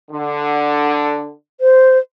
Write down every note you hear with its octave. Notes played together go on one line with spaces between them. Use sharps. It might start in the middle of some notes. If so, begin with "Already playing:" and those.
D3
C5